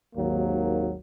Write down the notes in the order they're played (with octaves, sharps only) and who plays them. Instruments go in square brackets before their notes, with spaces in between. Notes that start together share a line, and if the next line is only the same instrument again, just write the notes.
[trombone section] G#1 D#2 F#3 A#3